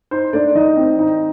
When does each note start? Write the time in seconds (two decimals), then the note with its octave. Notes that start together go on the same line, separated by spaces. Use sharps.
0.11 D#4 C5
0.33 A3 D4 D5
0.55 D#3 D#4 D#5
0.77 C4
0.99 D#4